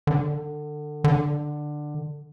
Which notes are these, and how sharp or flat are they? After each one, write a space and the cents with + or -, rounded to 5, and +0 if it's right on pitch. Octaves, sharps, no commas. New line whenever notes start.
D3 +25
D3 +15